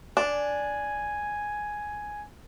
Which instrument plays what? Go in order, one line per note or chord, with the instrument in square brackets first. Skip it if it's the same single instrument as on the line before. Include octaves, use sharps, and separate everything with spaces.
[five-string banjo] D4 [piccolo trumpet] G#5